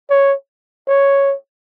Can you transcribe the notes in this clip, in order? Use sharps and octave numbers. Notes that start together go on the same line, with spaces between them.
C#5
C#5